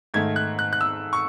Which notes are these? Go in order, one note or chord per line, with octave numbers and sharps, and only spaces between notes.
G#2 D#3 A3 G#6
F#6
F#6
F#6
E6
C#6